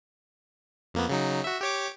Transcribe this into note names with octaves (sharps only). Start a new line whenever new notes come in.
F2 A#3 B3
C#3 F#3 D#4
F#4 E5
G4 C#5 D6